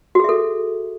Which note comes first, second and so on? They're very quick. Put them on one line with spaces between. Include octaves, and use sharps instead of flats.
F#4 G#4 E5 A4